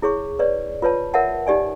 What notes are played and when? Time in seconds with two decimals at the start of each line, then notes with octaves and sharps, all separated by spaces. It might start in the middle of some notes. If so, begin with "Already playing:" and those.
0.02 E4 G#4 C#5 C#6
0.39 B4 C#5 D5
0.82 F4 B4 C#5 A5
1.14 A#4 C#5 E5 F#5 A5
1.47 D#4 G4 D5 G#5